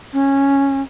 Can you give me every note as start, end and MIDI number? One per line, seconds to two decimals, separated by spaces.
0.13 0.82 61